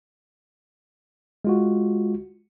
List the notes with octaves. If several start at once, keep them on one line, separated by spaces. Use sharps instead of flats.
G#3 F4 F#4